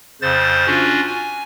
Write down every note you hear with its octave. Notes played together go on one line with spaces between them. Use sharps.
F2 C#3 C5 A6
C#4 D4 F4 F#4
G#5